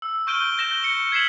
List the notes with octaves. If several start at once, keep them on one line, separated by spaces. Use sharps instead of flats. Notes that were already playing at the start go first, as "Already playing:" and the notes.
E6
C#6 F6 G6 D7 D#7 G7
G6 A#6 E7 G7
C#7
G#6 B6 C7 E7 F#7